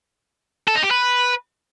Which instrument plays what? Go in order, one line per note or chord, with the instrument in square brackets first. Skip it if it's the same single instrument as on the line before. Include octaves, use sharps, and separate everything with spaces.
[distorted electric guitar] A4
D#4
G4
B4